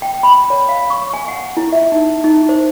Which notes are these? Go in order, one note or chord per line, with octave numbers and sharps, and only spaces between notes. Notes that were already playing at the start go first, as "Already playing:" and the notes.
G5
B5
C#5
F5
C#6
G#5
F#5
E4
E5
D#4
D#4
C5